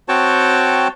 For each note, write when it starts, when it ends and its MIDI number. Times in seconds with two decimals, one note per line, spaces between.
0.09 0.88 60
0.09 0.88 66
0.09 0.88 73
0.09 0.88 79
0.09 0.88 81